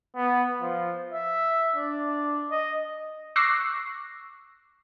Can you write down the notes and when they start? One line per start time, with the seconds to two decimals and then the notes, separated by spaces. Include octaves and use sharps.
0.16 B3
0.62 F3
1.13 E5
1.76 D4
2.51 D#5
3.36 C#6 D6 E6 F#6 A#6 C7